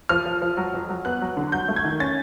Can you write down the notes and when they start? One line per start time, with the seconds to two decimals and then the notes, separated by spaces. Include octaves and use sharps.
0.09 F3 F6
0.26 F3
0.42 F3
0.57 F#3
0.73 F2
0.89 F#3
1.05 B3 F#6
1.22 F#3
1.37 D3
1.52 F#3 G6
1.68 A3
1.76 G#6
1.84 D#3
2.00 C#4 A6